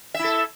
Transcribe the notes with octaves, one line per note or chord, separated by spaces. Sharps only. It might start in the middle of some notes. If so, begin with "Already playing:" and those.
E4 A4 E5